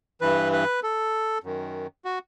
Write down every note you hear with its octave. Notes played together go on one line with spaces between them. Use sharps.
G2 E3 B4
B4
A4
F#2 D#3
F#4